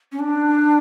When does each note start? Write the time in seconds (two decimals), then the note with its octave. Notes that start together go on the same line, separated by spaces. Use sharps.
0.12 C#4
0.19 D4